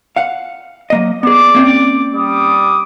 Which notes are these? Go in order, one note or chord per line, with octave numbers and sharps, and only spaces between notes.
F5 F#5
F#3 A#3 D#5
B3 G#4 D5 D6
A#3 C4 C#4
G3 D6 D#6